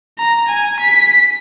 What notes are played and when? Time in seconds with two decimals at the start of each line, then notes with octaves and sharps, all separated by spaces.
0.18 A#5
0.49 G#5
0.80 B6